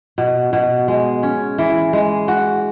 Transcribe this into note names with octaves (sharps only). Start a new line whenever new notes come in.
B2
B2
G#3
C#4
E3
G#3
F#4